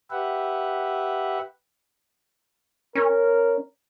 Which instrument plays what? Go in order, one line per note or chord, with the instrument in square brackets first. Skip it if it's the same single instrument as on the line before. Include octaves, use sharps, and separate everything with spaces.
[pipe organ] G4 B4 E5 F#5
[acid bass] C#4 [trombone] A#4